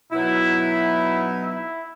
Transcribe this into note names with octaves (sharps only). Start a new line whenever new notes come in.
B2 F#3 B3 D#4 E4
E4